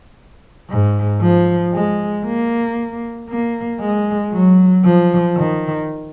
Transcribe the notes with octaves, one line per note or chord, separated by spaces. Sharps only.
G#2
F3
G#3
A#3
A#3
G#3
F#3
F3
D#3